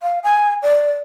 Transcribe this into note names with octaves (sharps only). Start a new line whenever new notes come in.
F5
G#5
D5